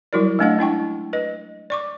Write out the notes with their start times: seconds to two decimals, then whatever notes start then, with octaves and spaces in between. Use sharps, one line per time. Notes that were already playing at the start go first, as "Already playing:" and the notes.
0.13 F#3 G3 E4 F#4 A#4 D5
0.39 G#3 A3 C#4 D4 D#5 F#5
0.59 D4 E4 G5 C#6
1.13 B4 D#5
1.70 D5 C#6 D6